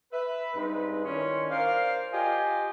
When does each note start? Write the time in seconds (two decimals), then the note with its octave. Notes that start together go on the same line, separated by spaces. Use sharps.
0.12 B4 E5
0.55 G2 G#3 C4 D#4 B4 B5
1.04 D#3 C#4 D4 E4 C#5 C6
1.51 A#4 C5 D5 F5
2.12 F4 G4 D#5 G#5